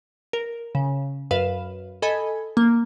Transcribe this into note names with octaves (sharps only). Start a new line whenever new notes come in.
A#4
C#3
F#2 B4 F5 E7
A4 D#5 G#5 B5 G#6
A#3